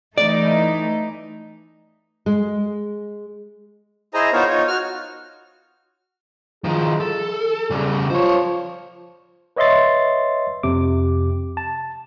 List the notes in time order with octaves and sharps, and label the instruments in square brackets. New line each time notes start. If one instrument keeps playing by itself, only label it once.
[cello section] E3 A3 D#4 [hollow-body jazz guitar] D5
[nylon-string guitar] G#3
[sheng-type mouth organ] E4 G#4 C5 D#5 G#5 A#5
B3 D#4 F4 A#4 C5 C#5
D#4 F4 C#5
F#4 F6
[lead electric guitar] D#3 F3 [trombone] G#4
[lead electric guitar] A4
C#3 G3
[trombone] F3 [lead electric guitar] C5 C#5
[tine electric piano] B4 C#5 D#5 E5 C6 A6
F2 C3 D6
A5